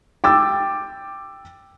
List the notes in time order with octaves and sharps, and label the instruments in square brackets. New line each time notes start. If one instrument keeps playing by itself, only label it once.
[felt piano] G5 D6 E6 A6